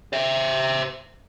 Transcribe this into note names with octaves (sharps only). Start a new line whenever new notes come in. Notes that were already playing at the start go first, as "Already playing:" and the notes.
C5 E5